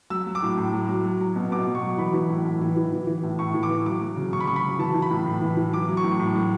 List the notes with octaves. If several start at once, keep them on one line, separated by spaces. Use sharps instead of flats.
F#3 E6
F#3
D6
A2
A2
F#3
F#3
F#3
F#3
B2
B2 D6
F#3
C#6
F#3
E3 B5
E3
A2
A2
E3
E3
E3
E3
A2
A2 C#6
E3
D6
E3
F#3 D6
F#3
C#3
C#3 C#6
B5
F#3 C#6
B5
F#3
E3 A5
E3
B5
A2
A2
E3
E3
F#3 D6
F#3
C#6
A2
A2
F#3